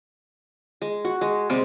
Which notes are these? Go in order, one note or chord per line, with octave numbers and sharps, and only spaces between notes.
G#3
F#4
G#3
C3 G3 G#3 C4